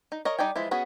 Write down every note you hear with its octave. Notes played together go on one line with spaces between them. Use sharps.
D#4
A#4 C#5 D#5
G3 D#4 D5 G5 G#5
E3 F3 G#3 E4
B3 C#4 F#4 G#4